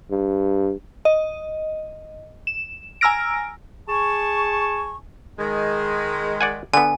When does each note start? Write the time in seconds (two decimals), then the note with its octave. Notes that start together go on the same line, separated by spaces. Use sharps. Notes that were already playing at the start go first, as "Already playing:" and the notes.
0.11 G2
1.05 D#5
2.47 E7
3.01 G#5 A#5 E6 F6 A#6 D7
3.89 G#4 G#5 A5 C#6
5.39 D#3 G#3
6.41 D5 F#5 G#5
6.74 D3 B3 G#5